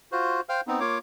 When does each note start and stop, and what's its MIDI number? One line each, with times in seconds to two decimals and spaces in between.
0.12 0.41 65
0.12 0.41 66
0.12 0.41 72
0.49 0.61 72
0.49 0.61 77
0.49 0.61 79
0.49 0.61 89
0.67 0.80 59
0.67 0.80 60
0.67 0.80 63
0.80 0.98 58
0.80 0.98 65
0.80 0.98 73
0.80 0.98 86